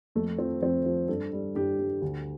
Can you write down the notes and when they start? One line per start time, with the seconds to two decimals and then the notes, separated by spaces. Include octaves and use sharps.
0.15 F2 A3
0.38 F3 C4
0.61 F2 C4
0.86 F3
1.08 G2 A4
1.33 G3
1.55 G2 G4
1.79 G3
2.02 D2